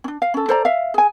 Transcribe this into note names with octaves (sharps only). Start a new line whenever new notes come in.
C#4 D4
F5
C#4 A4
A4 C5 D5 A#5
E5 F5
G#4 G#5